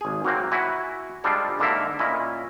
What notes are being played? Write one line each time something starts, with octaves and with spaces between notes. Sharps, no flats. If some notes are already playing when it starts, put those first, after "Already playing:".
G#1 G#4
F#3 A#3 C4
E4 F#4 G#5
G3 G#3 D4 F4 A4 C5
G#2 D3 A#3 A4 A#4 E5
A#2 C#4 E4 D#5